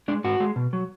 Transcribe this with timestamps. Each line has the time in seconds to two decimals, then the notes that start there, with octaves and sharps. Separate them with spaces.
0.08 G#3 D4
0.24 G#2 F#4
0.40 G#3
0.56 B2
0.73 F#3